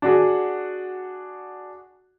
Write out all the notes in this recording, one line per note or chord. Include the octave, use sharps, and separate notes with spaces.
D4 F#4 G#4